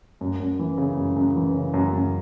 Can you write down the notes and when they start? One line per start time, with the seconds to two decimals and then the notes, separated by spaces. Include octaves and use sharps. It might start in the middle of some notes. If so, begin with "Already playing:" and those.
0.21 F#2
0.40 F#2
0.59 E3
0.78 C#3
0.97 F#2
1.16 F#2
1.36 E3
1.55 C#3
1.74 F#2
1.93 F#2